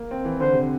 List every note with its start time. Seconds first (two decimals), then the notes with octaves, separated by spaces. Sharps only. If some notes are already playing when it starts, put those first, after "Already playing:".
Already playing: A#3
0.11 C4
0.25 E3
0.39 D3 C5
0.53 C3